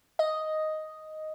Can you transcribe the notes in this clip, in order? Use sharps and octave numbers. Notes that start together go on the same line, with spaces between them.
D#5